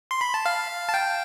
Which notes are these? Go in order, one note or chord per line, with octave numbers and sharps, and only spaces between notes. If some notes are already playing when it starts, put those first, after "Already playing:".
C6
B5
A5
F5
A5
G5